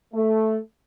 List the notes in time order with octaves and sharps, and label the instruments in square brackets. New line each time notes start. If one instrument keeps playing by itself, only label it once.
[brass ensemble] A3